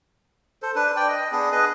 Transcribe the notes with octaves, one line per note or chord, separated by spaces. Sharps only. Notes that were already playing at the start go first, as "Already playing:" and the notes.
A4 C5
D4 B4
D5 G5
D#5
B3 D4 G#4
G#4 B4 D#5